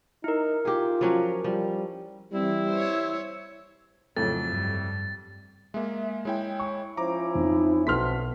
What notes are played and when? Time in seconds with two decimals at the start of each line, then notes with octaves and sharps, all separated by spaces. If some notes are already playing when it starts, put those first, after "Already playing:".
0.24 D#4 E4 A#4
0.65 F4 G4 G#4
1.01 F3 F#3 C#4
1.44 F3 G3
2.32 E3 G3 C4 E4
2.70 C5 C#5
4.17 F2 A2 C#3 F#3 A4 A6
4.53 G2 G3
5.74 G#3 A#3 E5
6.25 G#3 E4 C#5 G5
6.60 C#6
6.97 F3 C#4 E4 C5 A#5 D6
7.35 F2 D#4
7.87 B1 C4 F#4 A4 B4 C6 F6 B6